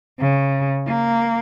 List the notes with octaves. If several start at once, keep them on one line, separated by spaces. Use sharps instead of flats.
C#3
A#3